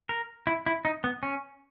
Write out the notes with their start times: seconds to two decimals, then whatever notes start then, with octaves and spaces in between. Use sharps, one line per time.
0.09 A#4
0.47 E4
0.66 E4
0.85 D#4
1.04 B3
1.23 C#4